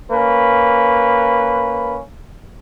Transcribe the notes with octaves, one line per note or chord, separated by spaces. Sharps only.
A#3 C#4 B4